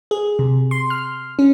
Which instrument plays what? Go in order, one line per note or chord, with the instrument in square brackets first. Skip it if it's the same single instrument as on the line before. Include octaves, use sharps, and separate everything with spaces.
[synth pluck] G#4
C3
C6
F6
C#4